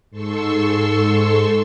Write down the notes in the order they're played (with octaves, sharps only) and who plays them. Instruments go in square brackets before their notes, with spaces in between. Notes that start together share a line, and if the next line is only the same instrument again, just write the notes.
[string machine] G#2 A4 C6 C#6 E6